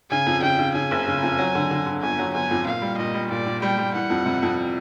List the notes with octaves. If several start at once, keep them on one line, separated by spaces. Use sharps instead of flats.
C#3 G#5
F2
C#3 G5
C#3
C#3 G#5
F#1
C#3
F2
F#3
D3
D3
D3
G1 G#5
F#3
G1 G#5
F2
A#2 F5
G3
A#2 D#5
G3
A#2 D5
A#2
G3 G5
G3
E3 F#5
F2
C3
F2